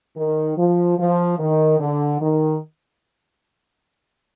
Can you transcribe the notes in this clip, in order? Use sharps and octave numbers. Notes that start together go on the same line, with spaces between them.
D#3
F3
F3
D#3
D3
D#3